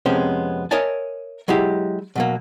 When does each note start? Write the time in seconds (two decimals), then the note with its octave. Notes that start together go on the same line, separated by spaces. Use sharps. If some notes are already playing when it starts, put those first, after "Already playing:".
0.06 F2 C3 G#3 B3 C#4 C5
0.71 A#4 C#5 D#5 E5 G#5 A5
1.48 F#3 G#3 E4 G4
2.15 B2 F#3 A#3